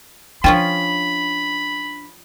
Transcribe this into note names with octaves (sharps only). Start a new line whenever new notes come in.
F3 C#4 D4 F4 G5 B5